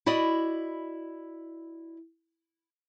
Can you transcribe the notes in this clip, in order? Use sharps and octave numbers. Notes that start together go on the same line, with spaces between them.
E4 F#4 D5 D#5